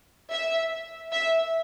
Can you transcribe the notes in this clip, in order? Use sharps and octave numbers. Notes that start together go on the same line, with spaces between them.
E5
E5